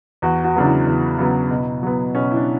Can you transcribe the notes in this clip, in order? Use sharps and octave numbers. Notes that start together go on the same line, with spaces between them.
E2 F#4
F#4
C#3 F#3 B3 D4
E4
E2
C#3 F#3 B3
B2
F#3 B3
B2 C#4
E4
D4